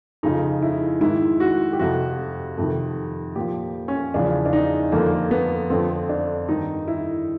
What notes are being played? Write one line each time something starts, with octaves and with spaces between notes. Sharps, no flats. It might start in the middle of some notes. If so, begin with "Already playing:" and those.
F2 C#3 F3 D#4
E4
G#2 D#3 E4
F#4
G4
F2 C3 F3 F#4
F2 C3 D#3
A#2 F3 G4
C#4
E2 C#3 F3 D4
D4
D#4
F2 D3 F3 A#3
B3
F2 D3 F3 C4
D4
G2 D#3 D#4
E4